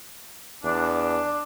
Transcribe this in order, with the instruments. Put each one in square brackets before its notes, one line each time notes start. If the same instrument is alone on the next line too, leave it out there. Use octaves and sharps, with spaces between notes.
[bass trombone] E2 [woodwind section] D4